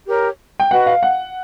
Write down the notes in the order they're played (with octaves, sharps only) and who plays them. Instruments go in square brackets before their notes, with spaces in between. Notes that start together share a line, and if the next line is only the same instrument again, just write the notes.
[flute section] G4 A#4 C#5
[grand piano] G5
[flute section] F#4 B4 D#5 [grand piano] F#5
[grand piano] F5
F#5